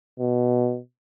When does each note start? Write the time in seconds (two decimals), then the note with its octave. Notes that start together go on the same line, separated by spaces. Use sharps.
0.20 B2